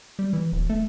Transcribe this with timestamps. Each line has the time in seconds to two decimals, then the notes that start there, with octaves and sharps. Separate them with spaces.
0.19 G3
0.33 E3
0.52 D#1
0.70 A3